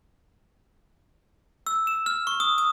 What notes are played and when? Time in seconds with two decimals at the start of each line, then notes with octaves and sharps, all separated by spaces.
1.67 E6
1.87 E7
2.06 F6
2.27 C#6
2.40 D#6
2.58 D#6